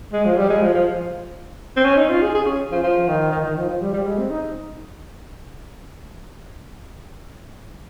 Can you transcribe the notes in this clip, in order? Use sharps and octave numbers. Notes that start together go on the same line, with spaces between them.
G#3
F3
G3
G#3
F3
F3
C4
C#4
D#4
F4
G#4
G#4
C#4
F3
F3
D#3
D#3
D#3
F3
F3
G3
G3
G#3
C4
D#4